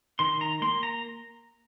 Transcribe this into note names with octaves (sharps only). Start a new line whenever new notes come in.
D#3 C6
A#5
A#3 C6
A#5